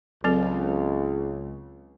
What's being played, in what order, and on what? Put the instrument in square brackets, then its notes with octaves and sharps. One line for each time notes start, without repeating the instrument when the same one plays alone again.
[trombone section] C#2 [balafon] F#3 C4 A4